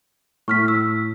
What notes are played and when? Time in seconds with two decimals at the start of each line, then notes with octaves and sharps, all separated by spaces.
0.48 A2 C#6 F6 B6
0.68 E6